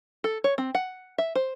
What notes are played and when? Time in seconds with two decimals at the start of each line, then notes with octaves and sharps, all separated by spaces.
0.24 A4
0.44 C#5
0.58 C4
0.75 F#5
1.18 E5
1.35 C5